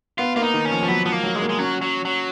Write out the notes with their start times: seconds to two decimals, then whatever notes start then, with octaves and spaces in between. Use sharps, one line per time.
0.18 B3 F4
0.36 A#3 F4
0.42 D#4
0.54 D#3
0.65 C#4
0.72 F3
0.83 F3
0.88 F#3 B3
1.05 F3 B3
1.12 A#3
1.24 F#3
1.36 G#3
1.42 A#3
1.49 G#3
1.59 F#3 C#4
1.81 F#3
2.05 F#3